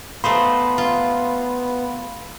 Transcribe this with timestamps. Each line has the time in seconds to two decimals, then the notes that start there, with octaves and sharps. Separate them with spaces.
0.24 A3 B3 D#4 C5 F5 B5 C6
0.78 F4